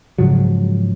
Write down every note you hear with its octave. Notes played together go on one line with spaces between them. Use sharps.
G#2 C#3 F3 F#3